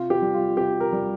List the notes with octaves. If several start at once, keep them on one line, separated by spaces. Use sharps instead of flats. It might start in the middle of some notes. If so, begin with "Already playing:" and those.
Already playing: C3 F4
G4
G3
F4
C3 G4
A#4
G3